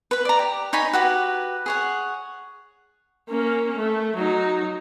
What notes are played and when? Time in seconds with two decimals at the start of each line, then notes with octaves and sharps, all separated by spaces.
0.11 B4 B5
0.25 D5 A#5
0.39 G4
0.73 D#4 C#5 G#5 B5
0.93 F#4 G4 B4
1.66 G#4 C#5 F#5
3.29 A#3 C#4
3.77 A3
4.16 F#3 D#4